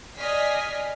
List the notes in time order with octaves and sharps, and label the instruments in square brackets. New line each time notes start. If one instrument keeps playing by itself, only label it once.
[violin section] D5 D#5 G#5 F6 B6 C7